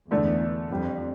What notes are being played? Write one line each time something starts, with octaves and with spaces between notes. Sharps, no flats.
E2 D3 A3 D4
F2 D3 G3 D4